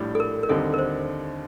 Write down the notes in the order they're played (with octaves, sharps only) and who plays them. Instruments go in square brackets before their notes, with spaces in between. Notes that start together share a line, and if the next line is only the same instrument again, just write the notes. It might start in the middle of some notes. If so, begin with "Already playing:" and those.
Already playing: [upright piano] A#1 A2 G3 D4 G4
[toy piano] A4
A#4
A#4
[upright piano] D#2 D3 G3 C4 D#4 [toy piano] A4
[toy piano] A#4
C5